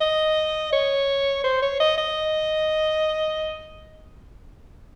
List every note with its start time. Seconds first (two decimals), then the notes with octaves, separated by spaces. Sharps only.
0.01 D#5
0.73 C#5
1.44 C5
1.63 C#5
1.80 D#5
1.98 D#5